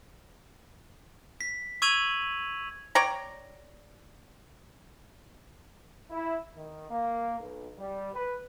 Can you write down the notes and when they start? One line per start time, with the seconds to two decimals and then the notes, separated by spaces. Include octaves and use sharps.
1.41 B6
1.82 C#6 E6 G#6 D#7 F7 F#7
2.95 C#5 D5 G5 A#5
6.10 E4
6.54 D#3
6.90 A#3
7.39 B1
7.78 G3
8.14 B4